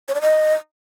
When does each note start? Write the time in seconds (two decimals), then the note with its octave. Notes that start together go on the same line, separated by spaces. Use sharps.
0.08 C#5
0.15 D5
0.21 D#5